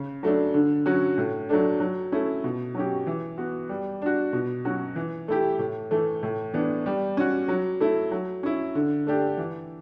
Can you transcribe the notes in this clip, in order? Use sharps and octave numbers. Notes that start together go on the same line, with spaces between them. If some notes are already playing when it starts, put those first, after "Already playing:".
Already playing: C#3
F#3 A3 D4
D3
F#3 C#4 F#4
A2
F#3 A3 D4
F#3
A3 C#4 E4
B2
F#3 C#4 G4
E3
B3 F#4
G3
D4 F#4
B2
F#3 C#4 F#4
E3
A3 E4 G4
A2
E3 A3
A2
E3 B3 D4
G3
C#4 F#4
F#3
A3 E4
F#3
C#4 E4
D3
A3 D4 G4
E3